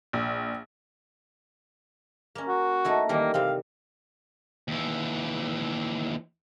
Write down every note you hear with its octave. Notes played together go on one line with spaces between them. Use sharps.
A#1
A#3 C#4
F#4
A3 D#4 E4
D#3 E3 G3 A#3
C3 G3 C4 F5
D#2 E3